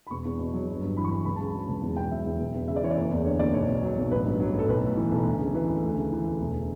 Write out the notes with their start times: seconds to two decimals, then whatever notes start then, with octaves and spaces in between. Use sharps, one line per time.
0.07 B5
0.10 E1 C#6
0.25 E2
0.39 B2
0.54 F#3
0.68 G1
0.82 G2
0.97 E3 B5
1.04 C#6
1.11 G1 B5
1.25 C#2 B5
1.36 C#3 A5
1.47 B5
1.54 F#3
1.68 C#2
1.82 E2
1.97 B2 G5
2.11 F#3 E5
2.26 E2
2.39 E1
2.54 E2
2.68 C#3 E5
2.76 D5
2.83 E3 C#5
2.91 D5
2.97 F#1
3.11 E2
3.25 D3 C#5
3.39 F#1 D5
3.54 B1 C#5
3.69 B2
3.83 F#3
3.97 B1
4.11 A1 B4
4.25 G2
4.40 F#3
4.54 A1 A4
4.68 B1 B4
4.83 A2
4.97 E3
5.12 B1
5.26 D2
5.40 C#3
5.54 E3 B4
5.69 D2
5.83 D2
5.97 C#3
6.12 E3
6.26 D2
6.41 E1